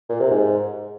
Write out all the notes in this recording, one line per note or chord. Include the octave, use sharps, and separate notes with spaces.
A#2
C3
G#2